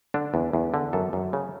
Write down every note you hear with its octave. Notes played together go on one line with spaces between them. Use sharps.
D3 D4
E2
E2
D3
F#2 A4
F#2
C#3